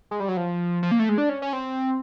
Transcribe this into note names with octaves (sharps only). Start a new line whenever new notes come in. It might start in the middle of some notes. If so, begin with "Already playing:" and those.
G#3
G3
F#3
F3
F3
A#3
A3
G#3
D4
C#4
C#4
C4